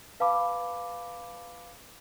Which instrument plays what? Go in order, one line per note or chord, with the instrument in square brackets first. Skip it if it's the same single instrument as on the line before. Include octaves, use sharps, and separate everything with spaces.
[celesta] B4 F5 A5 B5 D6